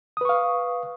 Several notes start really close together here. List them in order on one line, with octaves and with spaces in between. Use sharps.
D#6 B4 C#6 F5